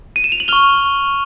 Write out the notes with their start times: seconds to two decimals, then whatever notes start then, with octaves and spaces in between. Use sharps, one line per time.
0.16 D#7
0.24 E7
0.32 F7
0.40 F#7
0.48 C#6 F6 F7 G7